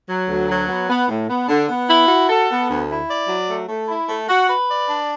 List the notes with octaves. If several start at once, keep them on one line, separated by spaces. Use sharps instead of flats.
F#3
D2
F#3
B3
B3
A2
B3
D3
B3
E4
F#4
A4
B3
D2
E4
D5
F#3
A3
A3
E4
A3
F#4
B4
D5
D4